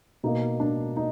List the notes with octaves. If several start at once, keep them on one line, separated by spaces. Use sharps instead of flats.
B2 A#3 D#4
D4
D#4